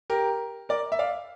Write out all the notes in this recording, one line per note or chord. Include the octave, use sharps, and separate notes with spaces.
G4 A#4
A#4 D5
E5
D5 F5